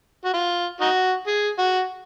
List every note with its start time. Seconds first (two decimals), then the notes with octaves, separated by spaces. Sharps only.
0.25 F#4
0.34 F4
0.81 D#4 F#4
1.27 G#4
1.59 F#4